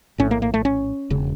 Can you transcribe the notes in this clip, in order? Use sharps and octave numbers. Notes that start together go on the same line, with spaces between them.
A#1 A2 C#4
A#3
A#3
A3
C#4
E1 C#3